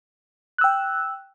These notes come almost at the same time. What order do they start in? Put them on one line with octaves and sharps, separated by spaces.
F#6 E6 G5